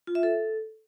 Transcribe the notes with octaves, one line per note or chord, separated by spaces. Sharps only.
F4
E5
A4